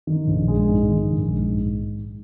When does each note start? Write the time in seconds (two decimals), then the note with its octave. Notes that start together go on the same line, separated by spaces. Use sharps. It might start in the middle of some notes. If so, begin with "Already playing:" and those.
0.07 D#3
0.27 A#1
0.48 G#3
0.69 G#2
0.89 D#3
1.10 A#1
1.30 G#3
1.50 G#2